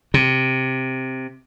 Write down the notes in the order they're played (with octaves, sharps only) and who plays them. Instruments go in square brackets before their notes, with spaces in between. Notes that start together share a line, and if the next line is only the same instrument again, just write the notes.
[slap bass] C3